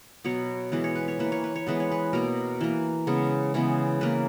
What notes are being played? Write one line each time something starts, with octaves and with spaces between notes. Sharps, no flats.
B2 F#3 B3 C#5
E3 G#3 B3 B4
C#5
B4
C#5
E3 A#3 B4
C#5
B4
C#5
E3 G#3 B3 B4
C#5
B4
B2 A#3 A#4
E3 A#3
C#3 G#3 B3
C#3 E3 G#3 B3
E3 A#3 B4